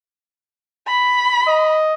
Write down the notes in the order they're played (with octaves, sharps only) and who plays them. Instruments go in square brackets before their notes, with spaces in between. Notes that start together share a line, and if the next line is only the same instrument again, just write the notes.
[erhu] B5
[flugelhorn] D#5